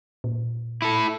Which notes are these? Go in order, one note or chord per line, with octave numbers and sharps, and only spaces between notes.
A#2
E4 A4